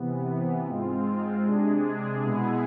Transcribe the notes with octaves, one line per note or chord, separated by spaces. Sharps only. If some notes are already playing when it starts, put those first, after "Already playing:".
Already playing: C3 E3 B3
G#2 G#3 C4 F4
C3 G#3 D4 G#4
B2 G#3 B3 E4 G#4